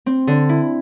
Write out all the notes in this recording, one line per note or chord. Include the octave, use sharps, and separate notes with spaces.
C4
D3
E4